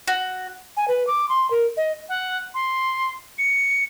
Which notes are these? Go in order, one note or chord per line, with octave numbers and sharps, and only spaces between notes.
F#4
G#5
B4
D6
C6
A#4
D#5
F#5
C6
C#7